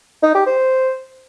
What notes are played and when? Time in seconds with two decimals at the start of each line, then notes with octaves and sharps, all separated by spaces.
0.23 D#4
0.35 G4
0.46 C5